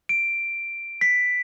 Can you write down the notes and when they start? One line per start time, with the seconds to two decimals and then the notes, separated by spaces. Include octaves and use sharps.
0.09 D7
1.01 B6